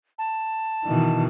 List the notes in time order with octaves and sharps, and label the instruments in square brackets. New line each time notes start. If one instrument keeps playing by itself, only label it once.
[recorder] A5
[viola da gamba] B2 D#3 E3